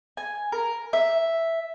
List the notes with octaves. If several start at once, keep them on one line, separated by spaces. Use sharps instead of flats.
G#5
A#4
E5